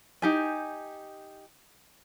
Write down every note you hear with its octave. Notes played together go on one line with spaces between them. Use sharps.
D#4 G4 G#5